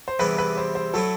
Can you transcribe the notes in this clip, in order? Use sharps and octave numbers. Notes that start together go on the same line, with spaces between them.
C5
E2 C3 E3 G3 D4 B4
B4
C5
C5
F#3 A3 E4 A4